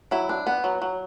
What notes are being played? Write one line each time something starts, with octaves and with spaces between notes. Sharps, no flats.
F#3 E4
D4
B3
F#3
F#3